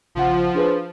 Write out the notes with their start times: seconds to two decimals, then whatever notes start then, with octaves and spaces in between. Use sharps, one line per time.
0.15 A#1 C#3 F3 F#5
0.55 D4 G#4 B4